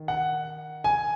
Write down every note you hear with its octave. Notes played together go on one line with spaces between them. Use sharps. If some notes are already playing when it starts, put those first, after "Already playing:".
Already playing: D#3
F#5
G#5